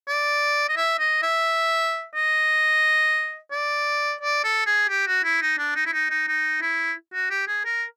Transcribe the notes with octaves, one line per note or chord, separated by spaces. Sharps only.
D5
D#5
E5
D#5
E5
D#5
D5
D5
A4
G#4
G4
F#4
E4
D#4
D4
D#4
E4
D#4
D#4
D#4
E4
F#4
G4
G#4
A#4